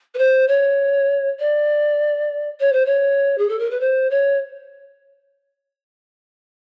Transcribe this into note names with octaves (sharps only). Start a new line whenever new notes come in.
B4
C5
C#5
D5
C#5
C5
C#5
G#4
A4
A#4
B4
C5
C#5